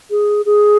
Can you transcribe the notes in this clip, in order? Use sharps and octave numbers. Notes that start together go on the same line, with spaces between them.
G#4
G#4